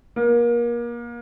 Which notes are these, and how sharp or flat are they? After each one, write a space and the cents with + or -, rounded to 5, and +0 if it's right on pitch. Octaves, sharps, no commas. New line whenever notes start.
A#3 +30